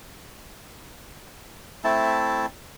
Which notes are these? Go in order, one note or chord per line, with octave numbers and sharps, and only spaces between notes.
A3 C4 E4 A5